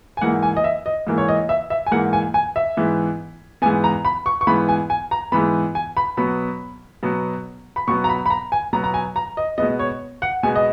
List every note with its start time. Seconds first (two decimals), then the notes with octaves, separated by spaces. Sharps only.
0.17 G#5
0.21 G#2 E3 A#3 F#5
0.43 G#5
0.57 D#5
0.64 E5
0.86 D#5
1.07 G#2 E3 A#3
1.18 C#5
1.28 D#5
1.49 E5
1.70 E5
1.86 G#5
1.91 G#2 E3 A#3 F#5
2.13 G#5
2.34 G#5
2.56 E5
2.77 G#2 E3 B3
3.62 G#2 E3 B3 G#5
3.84 A#5
4.05 B5
4.26 C#6
4.41 C#6
4.47 G#2 E3 B3 B5
4.69 G#5
4.90 G#5
5.11 A#5
5.32 G#2 E3 B3 B5
5.75 G#5
5.97 B5
6.17 B2 F#3 B3 B5
7.03 B2 F#3 B3
7.76 B5
7.88 B2 F#3 B3 C#6
8.04 A#5
8.09 B5
8.26 B5
8.30 A#5
8.52 G#5
8.73 B2 F#3 B3 A#5
8.84 A#5
8.94 G#5
9.16 A#5
9.37 D#5
9.58 B2 G#3 B3 D#5
9.79 C#5
10.22 F#5
10.43 B2 G#3 B3 G#5
10.56 D#5